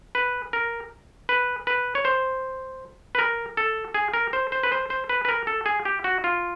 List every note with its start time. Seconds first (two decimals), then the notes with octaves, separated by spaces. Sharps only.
0.15 B4
0.53 A#4
1.29 B4
1.67 B4
1.95 C#5
2.05 C5
3.15 B4
3.19 A#4
3.57 A4
3.94 G#4
4.14 A#4
4.33 C5
4.52 C5
4.63 B4
4.72 C5
4.90 C5
5.09 B4
5.25 B4
5.29 A#4
5.47 A4
5.66 G#4
5.85 G4
6.04 F#4
6.24 F4